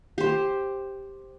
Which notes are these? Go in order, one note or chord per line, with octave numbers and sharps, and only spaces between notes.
G4 C5